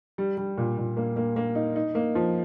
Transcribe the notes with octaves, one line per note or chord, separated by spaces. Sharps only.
G3
G3
A#2
A#2
A#3
A#3
A#3
D#4
D#4
A#3
F3